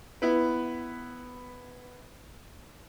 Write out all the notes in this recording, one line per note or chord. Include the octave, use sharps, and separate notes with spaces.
B3 E4 B4